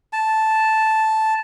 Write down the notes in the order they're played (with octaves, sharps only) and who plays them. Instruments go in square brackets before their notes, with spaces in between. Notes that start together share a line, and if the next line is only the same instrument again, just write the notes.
[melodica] A5